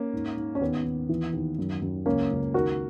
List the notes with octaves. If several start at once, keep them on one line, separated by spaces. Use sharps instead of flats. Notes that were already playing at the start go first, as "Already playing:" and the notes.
Already playing: A#3 C#4
G#2
G#2
C#4
D#2 B3
D#2
E3
D#2
F#2
F#2
C#2 A#3 C#4
C#2
D#3 F#4 A#4